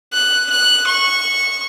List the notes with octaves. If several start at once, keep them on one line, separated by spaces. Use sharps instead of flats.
F#6
F#6
C#6